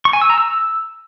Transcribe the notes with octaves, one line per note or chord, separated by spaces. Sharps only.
C#6
G#5
E6
A#5
E6